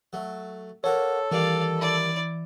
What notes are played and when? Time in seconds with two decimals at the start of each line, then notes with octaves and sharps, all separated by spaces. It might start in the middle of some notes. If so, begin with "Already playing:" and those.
0.13 F#3 A3
0.84 A#3 F#4 A4 A#4 C#5
1.32 D#3 E3 G3 A#3 D5 F5
1.77 E4 D5